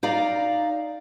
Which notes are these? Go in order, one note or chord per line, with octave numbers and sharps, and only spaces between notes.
D#4 D5 F5 A#5